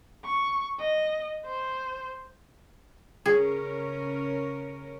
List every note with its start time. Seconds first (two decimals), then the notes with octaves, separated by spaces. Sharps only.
0.25 C#6
0.80 D#5
1.46 C5
3.26 C#3 C#4 G#4 A#4